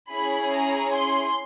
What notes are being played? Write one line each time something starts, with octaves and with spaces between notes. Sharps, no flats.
C#4 E4 G#4 B5
A#5
C6